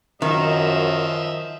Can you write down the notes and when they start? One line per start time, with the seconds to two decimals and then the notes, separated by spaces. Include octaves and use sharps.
0.22 F#2 D#3 F3 D#5 E5